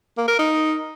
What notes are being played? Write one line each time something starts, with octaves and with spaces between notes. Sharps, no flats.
A#3
A#4
D#4